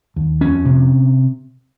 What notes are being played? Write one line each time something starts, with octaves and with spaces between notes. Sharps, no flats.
D#2
F2 C#4
C3